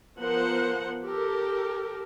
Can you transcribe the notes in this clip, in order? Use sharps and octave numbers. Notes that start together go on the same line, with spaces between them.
F3 B3 A#4 C5 F#5
G4 A4 A#4